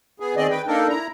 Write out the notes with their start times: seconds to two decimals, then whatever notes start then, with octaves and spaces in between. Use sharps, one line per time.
0.20 B3 G#4
0.36 D#3 C4 G#4 D5 D#5
0.50 B4 G5
0.67 A#3 D4 D#4 A4 A#4
0.89 E4 A#5